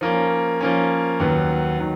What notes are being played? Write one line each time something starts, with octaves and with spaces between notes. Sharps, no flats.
F3 A#3 C#4
F3 A#3 C#4
D#2 D#3 F#3 B3
D#3 F#3